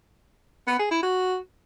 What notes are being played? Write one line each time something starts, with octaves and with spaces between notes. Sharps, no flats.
B3
G#4
E4
F#4